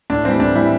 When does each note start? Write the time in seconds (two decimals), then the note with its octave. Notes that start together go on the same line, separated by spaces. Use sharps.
0.10 A2 D4
0.25 E3 G3 C4
0.40 A2 D4
0.56 E3 G3 E4